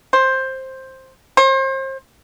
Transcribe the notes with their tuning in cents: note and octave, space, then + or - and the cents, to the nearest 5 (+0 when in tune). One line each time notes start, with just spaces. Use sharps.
C5 +10
C5 +35